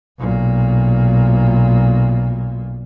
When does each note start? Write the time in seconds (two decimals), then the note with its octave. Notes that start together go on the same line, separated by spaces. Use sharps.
0.19 B1 A#2